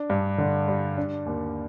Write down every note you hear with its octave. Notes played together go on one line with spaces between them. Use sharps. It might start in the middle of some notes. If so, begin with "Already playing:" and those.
Already playing: D4
G2
D3
G3
D4
D#2